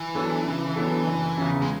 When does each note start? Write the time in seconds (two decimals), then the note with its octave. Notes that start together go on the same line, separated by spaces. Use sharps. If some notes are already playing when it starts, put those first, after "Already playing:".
Already playing: E3
0.15 F#3 B3 D4 A4
0.46 C#3
0.76 F#3 B3 D4 A4
1.07 F#1
1.38 E2 C#3
1.62 G#3